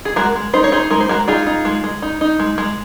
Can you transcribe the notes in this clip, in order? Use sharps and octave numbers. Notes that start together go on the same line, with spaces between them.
G#4
G#3 F#4 A#4
G#3
D#4 C5
C#5
D#4 G#4 C5
G#3 A#4
C5
G#3 F#4 A#4
D#4 F4 G#4
D#4
G#3
G#3
D#4
D#4
G#3
G#3